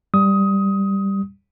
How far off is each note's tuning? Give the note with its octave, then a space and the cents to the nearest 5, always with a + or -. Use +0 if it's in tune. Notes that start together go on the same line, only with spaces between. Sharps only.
G3 +0 D#6 +15